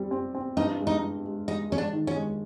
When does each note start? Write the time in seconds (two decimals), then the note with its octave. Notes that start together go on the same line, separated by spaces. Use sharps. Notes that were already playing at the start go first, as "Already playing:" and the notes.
Already playing: G3 C4
0.11 C4
0.35 C4
0.57 G2 D#4
0.79 G#3
0.87 D#4
1.01 G2
1.24 G#3
1.48 G#3 D#4
1.70 G#3 C#4
1.78 D4
1.93 D#3
2.07 C#4
2.15 G#3